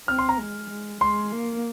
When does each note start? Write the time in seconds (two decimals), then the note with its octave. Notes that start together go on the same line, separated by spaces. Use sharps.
0.08 C4 F6
0.18 C6
0.29 A#5
0.39 G#3
0.70 G#3
1.01 G#3 C6
1.32 A#3